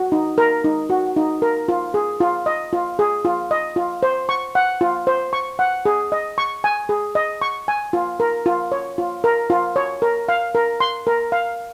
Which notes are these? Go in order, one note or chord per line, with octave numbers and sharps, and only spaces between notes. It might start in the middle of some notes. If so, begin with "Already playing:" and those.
Already playing: F#4
D#4
A#4
D#4
F#4
D#4
A#4
F4
G#4
F4
D#5
F4
G#4
F4
D#5
F4
C5
C#6
F#5
F4
C5
C#6
F#5
G#4
D#5
C#6
G#5
G#4
D#5
C#6
G#5
F4
A#4
F4
C#5
F4
A#4
F4
C#5
A#4
F5
A#4
C6
A#4
F5